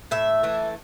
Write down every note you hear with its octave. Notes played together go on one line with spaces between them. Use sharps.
A2 E5
E3 A3